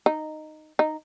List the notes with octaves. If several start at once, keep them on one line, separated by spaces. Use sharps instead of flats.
D#4
D#4